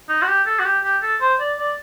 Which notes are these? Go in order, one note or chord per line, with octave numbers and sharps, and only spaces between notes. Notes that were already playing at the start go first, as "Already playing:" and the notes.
D#4
F#4
G4
A4
F#4
G4
G4
A4
C5
D5
D5